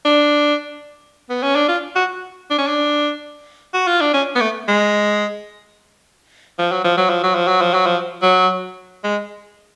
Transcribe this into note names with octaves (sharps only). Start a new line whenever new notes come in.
D4
B3
C#4
D4
F4
F#4
D4
C#4
D4
F#4
F4
D4
C#4
B3
A3
G#3
F3
F#3
F3
F#3
F3
F#3
F3
F#3
F3
F#3
F3
F#3
G#3